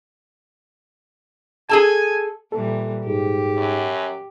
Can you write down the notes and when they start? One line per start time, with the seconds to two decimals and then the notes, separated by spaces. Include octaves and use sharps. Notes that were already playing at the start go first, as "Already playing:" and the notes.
1.69 G#4 A4 G#5 A5
2.52 A#2 E3 G3 A4
3.06 G#2 G4
3.57 F#2